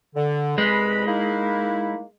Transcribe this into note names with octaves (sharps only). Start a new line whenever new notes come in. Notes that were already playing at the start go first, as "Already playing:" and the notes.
D3
C2 G#3 B4 B5
A#3 D#4 E4